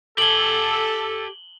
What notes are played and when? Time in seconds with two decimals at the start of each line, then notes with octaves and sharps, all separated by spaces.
0.18 G4 A4 G#5 F#7 G7